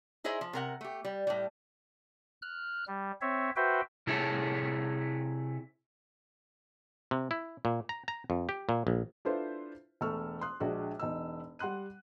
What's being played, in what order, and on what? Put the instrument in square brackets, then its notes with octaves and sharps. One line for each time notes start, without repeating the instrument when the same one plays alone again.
[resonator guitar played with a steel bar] D#4 E4 G#4 C5 D#5 E5
F3
C3 A#4 F#5
A3 G4
G3
A2 G3
[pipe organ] F6 F#6
G3
C4 C#5 E5
F#4 B4 C5 E5 G5
[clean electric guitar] C3 E4 G#4 C#5 E5 A5
[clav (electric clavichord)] C3
E4
A#2
A#5
A#5
F2
G4
A#2
A#1
[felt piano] D4 E4 F4 A4 B4 C5
E1 A3 C#6 E6 F6
C6 D#6 F#6
A#1 G#3 D4 F#4
E1 D#4 E6
G3 F#5 C6 F#6 D#7